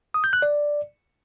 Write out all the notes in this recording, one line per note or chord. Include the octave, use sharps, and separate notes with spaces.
D#6
G6
F#6
D5